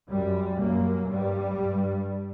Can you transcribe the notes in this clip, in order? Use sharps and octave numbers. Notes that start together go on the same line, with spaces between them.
F#2 G3
F#2 A#3
G2 G3
G2